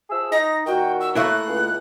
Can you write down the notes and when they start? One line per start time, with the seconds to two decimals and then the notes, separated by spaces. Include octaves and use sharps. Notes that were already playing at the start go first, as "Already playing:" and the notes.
0.10 F3 G#4 E6
0.32 D#4 A#6
0.66 A#2 D#3 F#4 G5
1.00 E6
1.15 A3 A#3 E4 C#5 F#6
1.47 C#2